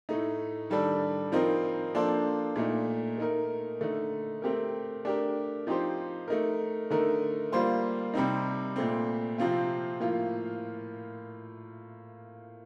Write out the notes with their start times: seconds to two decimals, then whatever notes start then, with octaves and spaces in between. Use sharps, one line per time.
0.09 A2 A3 D#4
0.70 D#3 G3 D4 A4
1.32 F3 C4 D#4 A#4
1.94 F3 A#3 D4 A4 C5
2.56 A#2 A3 D#4
3.18 A3 D#4 A#4
3.81 D3 A3 D#4
4.42 A3 C4 G4 A#4
5.05 A3 D4 G4 A#4
5.67 F3 C4 D#4 G4 C5
6.28 A3 D#4 A#4
6.90 D3 A3 D#4 A#4
7.52 G3 A#3 F4 C5
8.14 C3 G3 C4 D#4
8.76 A#2 A3 C4
9.38 C3 F3 C4 F4
10.00 A2 F3 A#3 F4